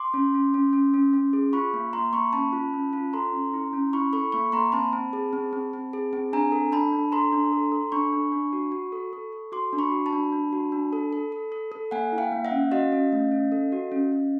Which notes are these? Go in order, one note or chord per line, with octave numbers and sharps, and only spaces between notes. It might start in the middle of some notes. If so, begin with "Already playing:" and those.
Already playing: C6 D6
C#4
C#4
C#4
C#4
C#4
C#4
G#4
F4 B5 C#6
A#3
A#3 A#5 C6
A#3 B5 C#6
C#4 A5 B5
F4
C#4
F4
A4 A#5 C6
C#4
E4
C#4
E4 B5 C#6
A4 B5 C#6
A#3 B5 C#6
A#3 A#5 C6
C4 A5 B5
C4
G#4
C4
C4
C4
G#4
C4
D4 G#5 A#5
A4
D4 A5 B5
D4
A4 A#5 C6
D4
A4
A4
D4 B5 C#6
D4
D4
F#4
F#4
A4
A4
A4
F#4 C6 D6
D4
B5 C#6
F#4
A5 B5
D4
D4
F#4
D4
A4
A4
A4
A4
A4
A#3 F#5 G#5
E4
F5 G5
A#3
E5 F#5
C#4
F#4 D#5 F5
C#4
A3
C#4
A4
F#4
C#4
C#4